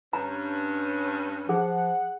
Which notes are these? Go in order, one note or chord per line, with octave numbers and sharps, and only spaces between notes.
G2 C#4 A#5
F3 G#4 F#5